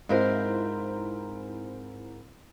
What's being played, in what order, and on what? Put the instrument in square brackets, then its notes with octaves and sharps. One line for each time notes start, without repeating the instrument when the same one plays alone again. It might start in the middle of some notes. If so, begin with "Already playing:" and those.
[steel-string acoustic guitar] G#2 A#4 C5 [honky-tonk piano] C4 E4 F4